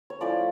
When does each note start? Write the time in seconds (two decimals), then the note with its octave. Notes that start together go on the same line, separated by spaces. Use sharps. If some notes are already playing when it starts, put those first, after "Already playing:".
0.10 C#5
0.20 F3 A3 C#4 E4 D5